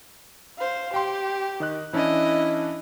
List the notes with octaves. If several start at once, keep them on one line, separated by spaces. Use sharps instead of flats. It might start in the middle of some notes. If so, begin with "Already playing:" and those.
C5 F5
G4 G5 C6
D#3 D#5 F#6
E3 C#4 D4 E4 D#5